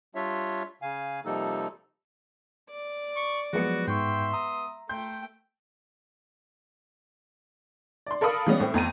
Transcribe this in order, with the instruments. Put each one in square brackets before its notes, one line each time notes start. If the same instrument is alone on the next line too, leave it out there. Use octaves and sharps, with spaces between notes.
[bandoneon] G3 D4 F4 C#5 E5
C#3 F5 G#5
C3 F3 G3 A#3 D#4 A4
[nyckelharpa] D5
[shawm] C#6
[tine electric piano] F3 F#3 [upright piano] G#3 B3 C#7 [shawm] F#4
[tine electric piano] G#2 C#6 [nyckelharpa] E5 C6 [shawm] G5
[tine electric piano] A#5 [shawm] D#6
[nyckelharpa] A3 G5 [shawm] C6 [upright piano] G6
[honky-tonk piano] D5 C6
A4 A#4 F5 B5 D#6
E3 G3 G#3 B3 C#4
A2 C4
F2 B3 A#5 D#7